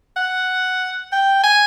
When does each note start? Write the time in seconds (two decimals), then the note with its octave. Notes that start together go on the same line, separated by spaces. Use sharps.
0.16 F#5
1.12 G5
1.43 G#5